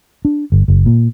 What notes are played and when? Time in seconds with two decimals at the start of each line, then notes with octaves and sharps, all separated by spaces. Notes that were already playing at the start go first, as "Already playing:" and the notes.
0.25 D4
0.52 G1
0.68 F#1
0.86 A#2